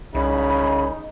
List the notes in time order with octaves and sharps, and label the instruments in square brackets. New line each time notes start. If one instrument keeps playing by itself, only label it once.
[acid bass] C2 [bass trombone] C#3 [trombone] D#4 [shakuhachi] B5